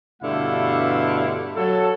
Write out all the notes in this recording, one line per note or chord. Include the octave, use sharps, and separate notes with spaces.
G2 B2 D3 A3 E4 F5
F#3 A4